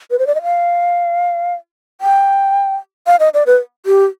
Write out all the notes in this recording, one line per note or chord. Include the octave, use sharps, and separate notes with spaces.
B4
C5
D5
D#5
F5
G5
F5
D#5
D5
B4
G4